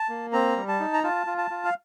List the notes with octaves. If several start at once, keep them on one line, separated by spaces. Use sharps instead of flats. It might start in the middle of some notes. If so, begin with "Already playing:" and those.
Already playing: A5
A#3
C4 A#5
G3
A5
D#4
A#5
F4 A5
F4
A5
F4
F5